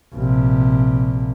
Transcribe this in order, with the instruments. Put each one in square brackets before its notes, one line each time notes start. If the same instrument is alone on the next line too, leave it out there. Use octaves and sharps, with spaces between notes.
[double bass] A#1 C3